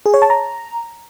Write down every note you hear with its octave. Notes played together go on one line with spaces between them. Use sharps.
G#4
C#5
A5
A#5